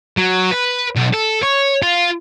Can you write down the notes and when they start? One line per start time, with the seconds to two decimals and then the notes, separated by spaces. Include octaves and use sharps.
0.17 F#3
0.52 B4
0.96 B1
1.13 A4
1.43 C#5
1.82 F4